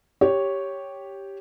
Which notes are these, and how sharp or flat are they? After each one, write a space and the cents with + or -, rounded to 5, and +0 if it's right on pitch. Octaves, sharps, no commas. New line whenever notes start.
G4 +0 C#5 +0